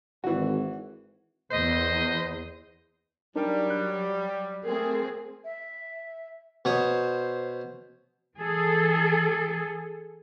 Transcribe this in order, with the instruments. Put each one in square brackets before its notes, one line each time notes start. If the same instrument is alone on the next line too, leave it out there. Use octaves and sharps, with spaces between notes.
[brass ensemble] G#1 [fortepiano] E3 F#4
[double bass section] E2 [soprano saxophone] C5 [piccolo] D#5
[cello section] F#3 [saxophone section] G3 [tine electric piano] D4 D#4 A#4
[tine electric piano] F#6
[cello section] A3 C4 G#4 [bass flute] A#4
[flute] E5
[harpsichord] B2 C#5 D#6 [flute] C5
[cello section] E3 G#4 A4